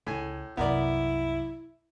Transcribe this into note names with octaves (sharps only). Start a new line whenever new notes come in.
C#2 A2 G#5
C2 F#2 B3 E4 A#4 D5